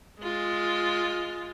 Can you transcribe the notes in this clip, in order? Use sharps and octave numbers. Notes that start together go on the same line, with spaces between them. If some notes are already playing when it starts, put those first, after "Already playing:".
G#3 F4